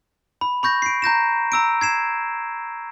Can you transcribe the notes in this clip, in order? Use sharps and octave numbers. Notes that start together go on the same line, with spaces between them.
B5
B5 C#6 G6 A#6
C7 D7
A#5 G6 A#6 E7
A#5 E6 D7
G#6 C7 E7